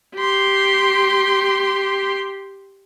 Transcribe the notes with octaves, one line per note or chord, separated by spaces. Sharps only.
G4 C6